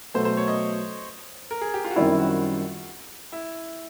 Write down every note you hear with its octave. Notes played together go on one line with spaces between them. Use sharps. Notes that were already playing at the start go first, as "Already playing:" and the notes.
B2 F#3 A3 C5
C5
C#5
D#5
A#4
G#4
G4
F4
F#4
F#2 D#3 G3 C4 E4 F4
F#4
E4